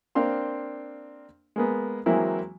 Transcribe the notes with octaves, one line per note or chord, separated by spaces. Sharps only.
A#3 C4 D4 F5 C6
G#3 A#3 B3
E3 F#3 G#3 A#3 C4 E4